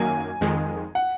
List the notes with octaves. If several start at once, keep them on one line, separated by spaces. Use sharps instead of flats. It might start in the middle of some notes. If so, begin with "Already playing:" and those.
Already playing: F#2 D#3 F#3 A#3 G#5
F2 D#3 G#3
F#5